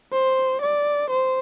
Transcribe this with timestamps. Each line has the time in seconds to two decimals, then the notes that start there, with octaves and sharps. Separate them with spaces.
0.12 C5
0.62 D5
1.10 C5